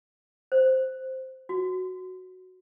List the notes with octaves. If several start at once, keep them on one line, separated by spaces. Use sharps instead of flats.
C5
F#4